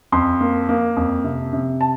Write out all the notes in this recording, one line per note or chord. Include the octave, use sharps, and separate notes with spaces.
F2 C6
A#3
A#3
F2
C3
C3
A5